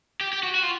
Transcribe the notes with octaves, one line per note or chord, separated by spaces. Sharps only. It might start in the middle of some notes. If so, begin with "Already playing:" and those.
G4
G4
F#4
F#4
F4